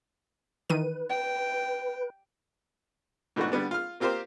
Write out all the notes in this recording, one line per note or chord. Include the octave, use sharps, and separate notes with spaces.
D#3 E3 B4 D#7
G5
G#2 B2 E3 A3 D4 F#4
D3 G3 B3 D4
F4 F6
A#3 C4 F4 G4 A#4 C5